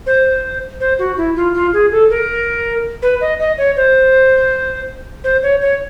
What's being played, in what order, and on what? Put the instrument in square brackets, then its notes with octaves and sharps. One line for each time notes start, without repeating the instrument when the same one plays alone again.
[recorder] C5
C5
F#4
E4
F4
F4
G#4
A4
A#4
B4
D#5
D#5
C#5
C5
C5
C#5
C#5